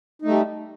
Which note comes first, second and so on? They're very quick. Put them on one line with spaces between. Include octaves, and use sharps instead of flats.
D#4 A3 G3